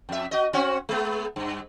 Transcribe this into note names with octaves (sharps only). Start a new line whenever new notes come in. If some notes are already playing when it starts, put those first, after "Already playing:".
F2 E5
F#4 D#5
C4 C#4 F#4
G#3 B3
G2